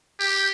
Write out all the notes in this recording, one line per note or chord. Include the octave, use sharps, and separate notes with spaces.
G4